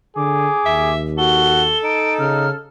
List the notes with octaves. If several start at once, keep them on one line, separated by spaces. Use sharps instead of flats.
D3 G#4 D6
D#2 E5
F#4 A4 G7
D#4 D7
C#3 F6